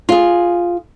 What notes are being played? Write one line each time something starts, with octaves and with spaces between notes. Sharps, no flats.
F4 G#4